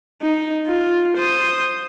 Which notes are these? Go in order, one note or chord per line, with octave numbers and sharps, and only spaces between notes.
D#4
F4
C5 D#6